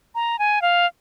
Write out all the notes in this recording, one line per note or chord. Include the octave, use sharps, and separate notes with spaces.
A#5
G#5
F5